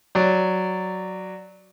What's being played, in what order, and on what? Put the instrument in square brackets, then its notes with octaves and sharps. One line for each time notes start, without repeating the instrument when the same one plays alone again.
[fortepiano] F#3 D5